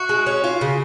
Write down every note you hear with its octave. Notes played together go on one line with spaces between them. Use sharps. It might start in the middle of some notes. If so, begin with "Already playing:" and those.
Already playing: F#4
G#3
C#4
F4
C#3